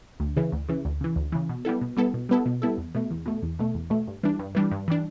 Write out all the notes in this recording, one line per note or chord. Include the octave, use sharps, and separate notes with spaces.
D2
C#3 E3
D2
C#3 E3
D2
C#3 E3
D2
C#3 E3
B2
G3 B3 E4 A4
B2
G3 B3 E4 A4
B2
G3 B3 E4 A4
B2
G3 B3 E4 A4
E2
B2 A3
E2
B2 A3
E2
B2 A3
E2
B2 A3
G2
E3 G3 D4
G2
E3 G3 D4
G2
E3 G3 D4